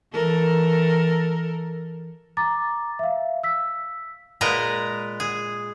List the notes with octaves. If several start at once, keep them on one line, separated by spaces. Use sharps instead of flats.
E3 A4 A#4
A#5 D6 A6
E5 F5
E6 B6
A#2 G#3 A#4 B4 A#5
G#4